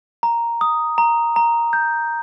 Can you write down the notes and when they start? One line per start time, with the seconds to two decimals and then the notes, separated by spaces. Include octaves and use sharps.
0.23 A#5
0.61 D#6
0.98 A#5
1.36 A#5
1.73 G6